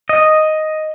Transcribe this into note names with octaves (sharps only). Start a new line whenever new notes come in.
D#5